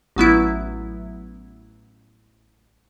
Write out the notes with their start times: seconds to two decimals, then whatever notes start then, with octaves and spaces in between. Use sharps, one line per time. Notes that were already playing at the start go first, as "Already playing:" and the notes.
0.16 A1 F#3 B3 E4